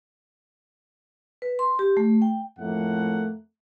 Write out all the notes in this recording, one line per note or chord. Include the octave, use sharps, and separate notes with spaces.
B4
C6
G4
A3
G5
F2 A2 A3 A#3 F#5